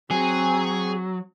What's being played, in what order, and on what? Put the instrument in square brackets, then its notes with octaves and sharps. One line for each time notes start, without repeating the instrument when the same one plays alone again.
[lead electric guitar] F#3 [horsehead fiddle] C4 [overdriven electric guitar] G#4